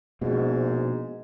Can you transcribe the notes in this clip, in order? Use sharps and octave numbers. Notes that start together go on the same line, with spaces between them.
A#1 G#2 B2 G#3